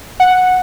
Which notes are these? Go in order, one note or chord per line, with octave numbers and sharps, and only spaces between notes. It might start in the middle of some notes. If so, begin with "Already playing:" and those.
F#5